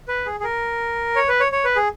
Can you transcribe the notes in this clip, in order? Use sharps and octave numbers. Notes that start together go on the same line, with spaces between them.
B4
G#4
G#4
A#4
C#5
B4
C#5
C#5
B4
G#4